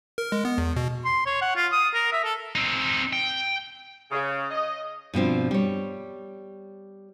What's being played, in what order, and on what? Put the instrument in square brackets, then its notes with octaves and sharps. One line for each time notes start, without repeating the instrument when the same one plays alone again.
[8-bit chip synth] A#4
G#3
B3
E2
B2
[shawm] C6
C#5
F#5
F4
D#6
A#4
E5
A4
[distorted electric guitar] C4 D#4
G5
[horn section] C#3
D#5
[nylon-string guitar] G2 B2 F3 C4
G3 C#5